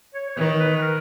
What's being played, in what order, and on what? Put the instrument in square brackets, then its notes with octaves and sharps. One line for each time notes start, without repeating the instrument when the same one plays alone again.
[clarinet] C#5
C#5
[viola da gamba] D#3 [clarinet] B4
[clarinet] B4
B4
A#4